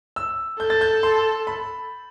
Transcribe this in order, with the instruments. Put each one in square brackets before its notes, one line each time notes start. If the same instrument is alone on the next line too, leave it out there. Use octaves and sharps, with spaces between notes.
[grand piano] E6
[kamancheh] A4 [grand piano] G6
[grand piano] A6
G6
C6
B5